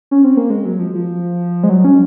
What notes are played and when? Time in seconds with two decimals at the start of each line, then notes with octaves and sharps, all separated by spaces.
0.11 C#4
0.24 C4
0.37 A#3
0.50 G#3
0.65 F#3
0.79 F3
0.95 F3
1.64 G#3
1.70 F#3
1.84 C#4